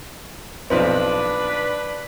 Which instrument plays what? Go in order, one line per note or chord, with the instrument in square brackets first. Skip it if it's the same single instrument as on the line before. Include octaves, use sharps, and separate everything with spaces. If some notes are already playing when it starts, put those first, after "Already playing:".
[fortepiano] B1 F3 C4 [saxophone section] D4 B4